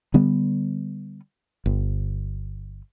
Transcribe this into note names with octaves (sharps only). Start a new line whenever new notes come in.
D3 G3 B3
G1